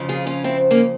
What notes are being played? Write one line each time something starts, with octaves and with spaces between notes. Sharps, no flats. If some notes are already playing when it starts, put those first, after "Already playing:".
Already playing: F2 C#3 F3
F4 G#4
C#4 F4
C4 E4
A#3 C#4